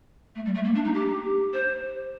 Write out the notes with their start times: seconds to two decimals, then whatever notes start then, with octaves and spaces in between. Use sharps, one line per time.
0.35 A3
0.45 G3
0.55 A3
0.64 A#3
0.75 D4
0.84 D#4
0.94 G4
1.53 C5